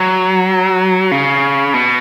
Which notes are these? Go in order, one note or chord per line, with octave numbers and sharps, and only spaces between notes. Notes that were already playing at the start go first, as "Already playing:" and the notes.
Already playing: F#3
C#3
B2